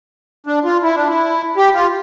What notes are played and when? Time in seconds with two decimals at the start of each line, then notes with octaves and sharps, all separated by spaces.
0.47 D4
0.65 F4
0.83 E4
0.96 D4
1.08 E4
1.57 G4
1.74 F4